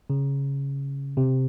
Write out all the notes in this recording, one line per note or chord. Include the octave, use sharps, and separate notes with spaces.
C#3
C3